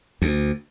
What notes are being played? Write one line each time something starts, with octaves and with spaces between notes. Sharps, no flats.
D2